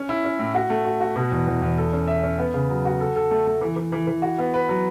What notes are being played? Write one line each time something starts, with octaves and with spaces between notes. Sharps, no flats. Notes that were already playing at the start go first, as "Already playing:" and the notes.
Already playing: C#4
E4
C#4
A2
F#4
A3
F#4
F#4
B2
E2
E2
E2
A4
C#4
E5
C#4
B3
C#3
F#3
F#4
A4
A4
A3
A3
E3
E3
E3
E3
F#4
B3
B4
F#3